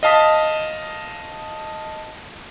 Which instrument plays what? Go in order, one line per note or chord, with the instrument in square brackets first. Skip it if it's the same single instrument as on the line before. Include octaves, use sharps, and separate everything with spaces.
[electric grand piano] D#5 F5 A5 D#6 B6